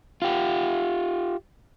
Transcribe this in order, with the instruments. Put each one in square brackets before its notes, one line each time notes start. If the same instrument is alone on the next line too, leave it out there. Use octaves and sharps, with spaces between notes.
[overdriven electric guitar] F4 G4